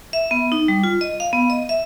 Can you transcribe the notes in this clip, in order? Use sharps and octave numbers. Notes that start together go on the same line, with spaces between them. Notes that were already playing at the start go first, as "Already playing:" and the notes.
E5
B3
D#4
G3
F4
D#5
F5
B3
D#5
E5